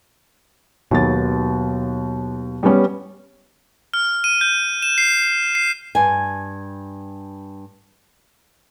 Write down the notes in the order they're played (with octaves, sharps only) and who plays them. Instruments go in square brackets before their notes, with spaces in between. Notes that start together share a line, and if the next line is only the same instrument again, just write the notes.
[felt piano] D#2 A6 [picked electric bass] B2 F#3
[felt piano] G3 B3 C#4
[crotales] F6
D#7
G6
E7
C7
C7
[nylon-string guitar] G2 G#5